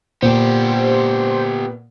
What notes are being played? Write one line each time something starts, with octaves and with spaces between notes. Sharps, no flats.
A#2 B3 G4 C5